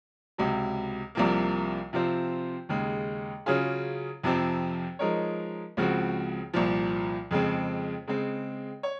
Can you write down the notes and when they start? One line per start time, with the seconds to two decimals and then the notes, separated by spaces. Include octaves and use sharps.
0.38 C#2 C3 F#3
1.15 C2 C3 F3 A#3
1.93 C3 F3 C4 F4 C5
2.69 D#2 C#3 G#3
3.46 C#3 F#3 C#4 F4 G#4
4.24 F2 C3 F3 C4
4.99 F3 G#3 D#4 A#4 C#5
5.77 C#2 C#3 F3 C4 F#4
6.54 C2 A#2 F3
7.31 F2 C#3 G#3 C4
8.07 C#3 G#3 C4
8.83 C#5